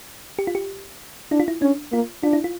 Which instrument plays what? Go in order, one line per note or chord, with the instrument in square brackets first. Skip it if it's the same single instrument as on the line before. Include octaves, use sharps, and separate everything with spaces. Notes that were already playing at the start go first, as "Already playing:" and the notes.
[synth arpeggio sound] G4
F4
G4
[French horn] D4 [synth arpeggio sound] E4
[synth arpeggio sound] F4
E4
[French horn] C#4 [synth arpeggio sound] D4
[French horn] A#3 [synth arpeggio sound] F4
[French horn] D4 [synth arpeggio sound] F4
[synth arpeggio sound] E4
F4